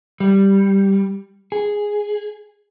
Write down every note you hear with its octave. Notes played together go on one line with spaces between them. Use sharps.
G3
G#4